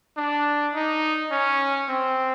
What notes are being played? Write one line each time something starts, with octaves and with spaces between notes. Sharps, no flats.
D4
D#4
C#4
C4